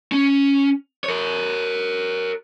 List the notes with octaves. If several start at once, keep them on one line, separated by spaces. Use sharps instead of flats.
C#4
A#4 C#5